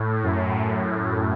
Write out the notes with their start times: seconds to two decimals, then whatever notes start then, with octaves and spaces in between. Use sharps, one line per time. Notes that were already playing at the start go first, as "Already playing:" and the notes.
Already playing: A2
0.23 F#2